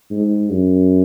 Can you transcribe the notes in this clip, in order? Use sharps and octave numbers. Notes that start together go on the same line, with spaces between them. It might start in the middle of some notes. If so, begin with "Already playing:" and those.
G#2
F#2